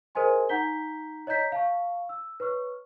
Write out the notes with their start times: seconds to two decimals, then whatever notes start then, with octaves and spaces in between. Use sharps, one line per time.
0.15 G#4 A#4 C5 D#5 G#5 C6
0.49 D#4 F#5 A#5 G6 B6 G7
1.27 C#5 D#5 A#5 G6 B6
1.52 F5 A5 C#6
2.09 E6
2.40 B4 C#5 C#6 F6